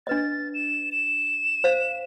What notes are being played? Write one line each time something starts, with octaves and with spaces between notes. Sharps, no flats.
D4 B4 D#5 A6
E7
E7
C5 F5